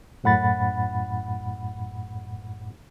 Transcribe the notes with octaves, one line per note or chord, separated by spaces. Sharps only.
F#2 A2 F#5 B5 A6